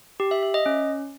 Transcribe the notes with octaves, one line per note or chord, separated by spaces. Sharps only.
G4
E5
E5
D#5
C#4